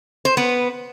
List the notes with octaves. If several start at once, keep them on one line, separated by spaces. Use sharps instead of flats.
C5
B3 B4